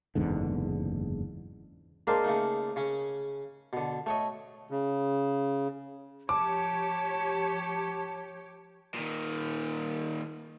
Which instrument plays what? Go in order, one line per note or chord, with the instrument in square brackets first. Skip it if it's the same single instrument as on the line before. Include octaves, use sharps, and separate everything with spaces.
[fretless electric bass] F#1 E2 G#2 D3
[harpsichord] G#3 A#3 D4 A#4 C5
C#3 A3 A#3 D#4
C#3 C#4
B2 D3
A3 C#5 D#5
[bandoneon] C#3
[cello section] F3 G4 C#5 [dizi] A5 [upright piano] D6
[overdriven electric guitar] A#2 D#3